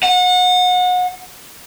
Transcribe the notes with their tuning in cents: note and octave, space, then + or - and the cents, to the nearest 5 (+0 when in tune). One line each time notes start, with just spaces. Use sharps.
F#5 -30